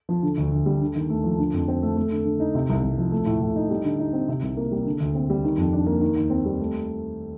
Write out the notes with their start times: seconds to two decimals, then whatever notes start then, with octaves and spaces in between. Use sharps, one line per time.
0.09 F3
0.23 D3
0.38 D2
0.52 D2
0.66 G3
0.81 D3
0.95 D#2
1.10 A3
1.24 F3
1.38 D3
1.53 F2
1.68 C4
1.83 A3
1.97 A3
2.12 D3
2.25 D3
2.40 D#4
2.55 C3
2.69 C2
2.83 C2
2.98 F3
3.12 A3
3.26 A2
3.41 A2
3.56 D#4
3.70 G3
3.84 D3
4.00 D#4
4.13 C4
4.29 C3
4.42 C2
4.57 A#3
4.72 G3
4.86 D3
5.00 D2
5.15 C4
5.30 G3
5.44 D#3
5.58 F2
5.73 D4
5.86 A#3
6.01 D#3
6.16 D#2
6.30 C4
6.45 G3
6.60 A3